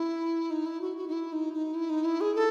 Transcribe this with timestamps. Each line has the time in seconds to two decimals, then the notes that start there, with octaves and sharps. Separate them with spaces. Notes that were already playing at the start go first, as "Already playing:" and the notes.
Already playing: E4
0.50 D#4
0.66 E4
0.81 F#4
0.97 F#4
1.08 D#4
1.12 E4
1.33 D#4
1.53 D#4
1.74 E4
1.90 D#4
2.05 E4
2.21 G#4
2.35 A4